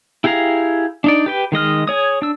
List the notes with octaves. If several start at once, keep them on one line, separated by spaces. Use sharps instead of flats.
E4 G4 G#4 F5 A#5
D4 D#4 D5
G4 B4 G5
D#3 G#3 D#5 F6
G#4 C#5 D#6
D4 E6